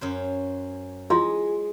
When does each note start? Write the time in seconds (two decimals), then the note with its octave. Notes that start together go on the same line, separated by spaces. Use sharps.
0.01 F#2 C#4 C5
1.10 G#3 E4 F4 C6